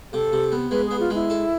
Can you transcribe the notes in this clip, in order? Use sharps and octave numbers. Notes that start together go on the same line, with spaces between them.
C3 A4
C3
B3
G#3 B4
B3 G#4
F4
G#3 E4
A4